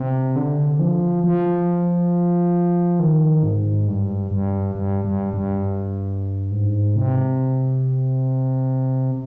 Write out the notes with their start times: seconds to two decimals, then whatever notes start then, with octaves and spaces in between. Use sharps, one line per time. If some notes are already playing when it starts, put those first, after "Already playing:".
Already playing: C3
0.36 D3
0.79 F3
1.24 F3
2.99 D#3
3.43 G#2
3.87 G2
4.31 G2
4.75 G2
5.05 G2
5.34 G2
6.51 G#2
6.96 C3